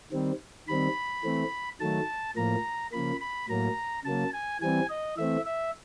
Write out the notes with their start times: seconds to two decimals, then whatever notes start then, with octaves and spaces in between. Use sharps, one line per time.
0.12 D#3 G3 C4
0.68 D#3 G3 C4 B5
1.24 E3 A3 C4
1.80 D#3 F#3 A3 A5
2.36 A2 F3 A#3 A#5
2.92 C#3 F3 A#3 B5
3.21 B5
3.49 A2 F#3 A#3 A#5
4.05 C#3 F#3 A#3 A5
4.33 G#5
4.61 E3 G3 C4 G#5
4.89 D#5
5.17 E3 A3 C4 E5
5.45 E5